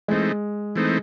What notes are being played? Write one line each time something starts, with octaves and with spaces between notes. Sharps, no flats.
E3 G#3 A3 C4 D#4
E3 A3 C4 D#4